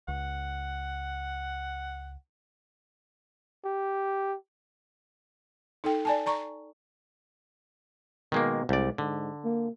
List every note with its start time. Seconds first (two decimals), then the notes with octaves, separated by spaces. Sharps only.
0.08 C#2 F#5
3.65 G4
5.84 D#4 A4 G5
6.05 D5 G#5 A5
6.26 D5 A#5 C#6
8.32 B2 D#3 G#3 A#3
8.69 C2 G#3 D5
8.98 G#2 D3
9.45 A#3